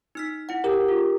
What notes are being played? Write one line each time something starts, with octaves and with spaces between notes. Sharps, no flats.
D#4 F6 B6
E4 F#5
G4 A#4
F4